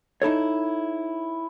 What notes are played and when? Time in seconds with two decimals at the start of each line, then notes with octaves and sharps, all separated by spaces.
0.22 D#4 E4 A4 C#5